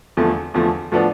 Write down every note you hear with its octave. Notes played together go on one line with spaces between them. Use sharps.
E2 D3 F3 A3
E2 D3 F3 A3
A2 F3 B3 D4